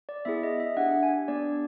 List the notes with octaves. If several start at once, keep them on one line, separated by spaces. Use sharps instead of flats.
D5
B3 E4 G#4 E5
D#5
E5
D4 G4 F#5
G#5
B3 D4 G4 D5